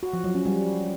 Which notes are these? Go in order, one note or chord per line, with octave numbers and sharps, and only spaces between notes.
F#4
F3
F#3
C#4
G3